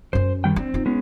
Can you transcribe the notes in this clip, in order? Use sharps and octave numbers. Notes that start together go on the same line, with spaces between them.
F#2 C#4 C5
D#3 G3 G5
C4 D4
D#4 F4
G#3 B3 C#4